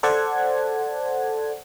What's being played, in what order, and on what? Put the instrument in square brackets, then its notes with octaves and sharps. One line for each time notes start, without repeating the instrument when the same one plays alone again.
[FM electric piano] A4 C5 D5 F#5 A5 G#6